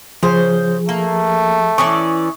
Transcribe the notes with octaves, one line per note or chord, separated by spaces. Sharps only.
C#3 F3 G#4 C5
A3 A#3
E3 C#4 D5 C#6 D#6